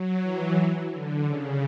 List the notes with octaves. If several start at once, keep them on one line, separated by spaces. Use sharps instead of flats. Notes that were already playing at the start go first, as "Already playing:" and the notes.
Already playing: F#3
E3
D3
C#3